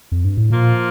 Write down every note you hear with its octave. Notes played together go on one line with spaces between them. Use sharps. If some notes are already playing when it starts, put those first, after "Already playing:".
F2
G2
A2
A#2 F3 A#3 F4